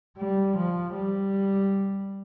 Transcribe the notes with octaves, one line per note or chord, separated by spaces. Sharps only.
G3
F3
G3